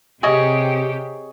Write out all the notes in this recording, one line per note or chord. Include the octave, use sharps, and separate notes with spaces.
C3 G4 G#4 C#5 D#5